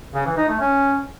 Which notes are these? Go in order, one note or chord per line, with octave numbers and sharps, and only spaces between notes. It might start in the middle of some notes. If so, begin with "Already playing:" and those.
C#3
E3
D#4
A3
C#4